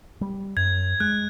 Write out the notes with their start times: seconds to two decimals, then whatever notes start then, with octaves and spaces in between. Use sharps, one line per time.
0.21 G3
0.57 F#2 G#6
1.00 G#3 F#6